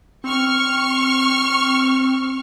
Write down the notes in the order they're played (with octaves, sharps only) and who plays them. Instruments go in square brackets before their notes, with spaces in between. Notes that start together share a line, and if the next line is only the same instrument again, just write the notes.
[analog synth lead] C4 [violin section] C#6 F6